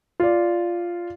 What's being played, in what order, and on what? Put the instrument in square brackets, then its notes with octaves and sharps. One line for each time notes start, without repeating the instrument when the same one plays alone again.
[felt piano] F4 D5